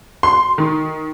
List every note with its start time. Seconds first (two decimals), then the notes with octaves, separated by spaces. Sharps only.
0.23 C6
0.58 D#3